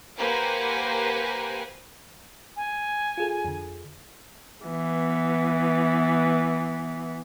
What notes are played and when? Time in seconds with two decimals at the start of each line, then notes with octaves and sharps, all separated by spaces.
0.17 A#3 G4 B4 C5 F#5 G#5
2.56 G#5
3.18 F4 G#4 A4
3.45 F2 D3
4.66 E3 B3